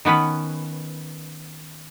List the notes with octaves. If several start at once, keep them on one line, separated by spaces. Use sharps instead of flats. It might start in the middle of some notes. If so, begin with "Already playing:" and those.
D#3 B3 C#4 B4